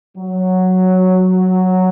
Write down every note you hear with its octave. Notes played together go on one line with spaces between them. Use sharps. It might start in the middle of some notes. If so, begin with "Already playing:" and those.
F#3